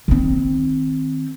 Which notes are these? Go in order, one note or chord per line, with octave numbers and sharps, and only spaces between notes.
D#3 C4